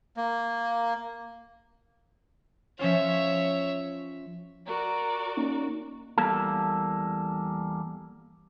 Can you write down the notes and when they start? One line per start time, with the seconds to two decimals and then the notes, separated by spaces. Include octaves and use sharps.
0.17 A#3
2.79 F3 C#4 F4 C#5 E5
4.66 F#4 A#4 D5
5.37 A#3 C#4 D#4
6.18 E2 G3 A#3 A4